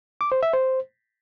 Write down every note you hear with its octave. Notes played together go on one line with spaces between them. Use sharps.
D6
C5
E5
C5